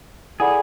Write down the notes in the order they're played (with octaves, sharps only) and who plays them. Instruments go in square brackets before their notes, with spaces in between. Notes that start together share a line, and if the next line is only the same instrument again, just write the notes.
[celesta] E4 A4 D5 F#5 B5 [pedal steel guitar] G#4